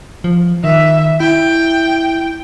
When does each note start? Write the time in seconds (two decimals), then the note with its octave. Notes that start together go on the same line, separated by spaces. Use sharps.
0.24 F3
0.64 D#3 E5
1.20 E4 G5